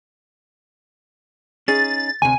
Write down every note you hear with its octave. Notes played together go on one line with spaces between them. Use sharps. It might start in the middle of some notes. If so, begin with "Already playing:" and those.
C#4 D#4 G#4 A6
D2 C3 G#5